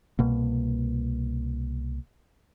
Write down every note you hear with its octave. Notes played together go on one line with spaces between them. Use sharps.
C2 B2 A#3